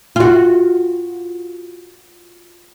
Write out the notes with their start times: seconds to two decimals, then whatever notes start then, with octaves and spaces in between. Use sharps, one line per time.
0.16 F4 F#4